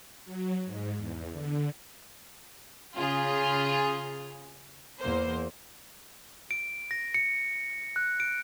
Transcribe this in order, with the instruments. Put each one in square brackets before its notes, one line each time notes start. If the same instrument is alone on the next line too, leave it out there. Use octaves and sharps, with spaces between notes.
[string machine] F#3
G#2
E2
D3
[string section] C#3 F4 G#4
E2 A#3 C5
[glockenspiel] D7
A#6
C#7
F#6
D7